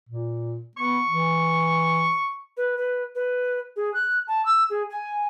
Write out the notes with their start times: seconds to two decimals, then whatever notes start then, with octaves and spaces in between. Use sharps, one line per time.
0.09 A#2
0.77 B3 C#6
1.08 E3
2.57 B4
2.77 B4
3.15 B4
3.76 G#4
3.94 F#6
4.28 A5
4.45 E6
4.70 G#4
4.90 G#5